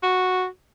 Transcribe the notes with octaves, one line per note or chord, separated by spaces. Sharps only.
F#4